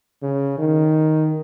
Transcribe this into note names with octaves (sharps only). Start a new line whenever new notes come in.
C#3
D#3